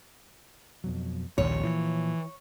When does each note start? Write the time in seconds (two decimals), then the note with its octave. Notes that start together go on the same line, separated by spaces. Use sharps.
0.84 F2 B2 F#3
1.38 A#1 D#2 A#2 C#5
1.63 A#2 E3 F3